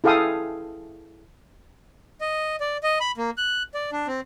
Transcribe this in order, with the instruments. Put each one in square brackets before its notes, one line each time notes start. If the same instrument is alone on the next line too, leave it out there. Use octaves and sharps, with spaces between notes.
[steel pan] E4 G#4 A4 F5 G5 D#6
[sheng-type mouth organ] D#5
D5
D#5
B5
A#3
F#6
D5
D4
C4